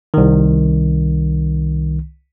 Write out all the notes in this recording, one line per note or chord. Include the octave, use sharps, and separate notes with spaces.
C2 D#3